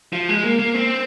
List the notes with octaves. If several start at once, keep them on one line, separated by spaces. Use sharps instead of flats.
F3
G#3
A#3
A#3
C4